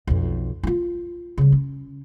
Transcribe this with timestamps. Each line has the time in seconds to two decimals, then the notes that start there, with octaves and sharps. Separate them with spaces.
0.07 B1 F2
0.63 D#4 F4
1.38 C#3 G3
1.52 C#4